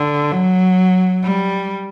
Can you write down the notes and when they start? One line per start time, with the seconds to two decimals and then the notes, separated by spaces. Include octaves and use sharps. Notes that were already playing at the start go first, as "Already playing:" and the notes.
Already playing: D3
0.32 F#3
1.24 G3